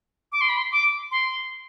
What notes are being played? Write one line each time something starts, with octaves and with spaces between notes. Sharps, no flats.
D6
C6
B5
C6
D6
C6